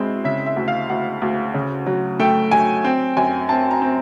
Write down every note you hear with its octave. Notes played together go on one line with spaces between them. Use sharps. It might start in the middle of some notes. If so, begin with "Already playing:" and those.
Already playing: B2 G#3 C4 E4
C#3 E5
E5
D2
F5
D2 F#5
D2
C#3
F#3
A3 G5
F#3 G#5
C4 G5
F#2 G#5
C4 A5
A#5
C4